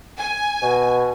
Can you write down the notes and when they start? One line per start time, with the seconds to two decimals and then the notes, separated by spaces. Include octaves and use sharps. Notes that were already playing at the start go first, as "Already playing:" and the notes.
0.18 G#5
0.63 B2